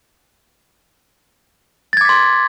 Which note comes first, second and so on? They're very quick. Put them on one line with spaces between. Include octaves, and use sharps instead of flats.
A6 G#6 D6 B6 C6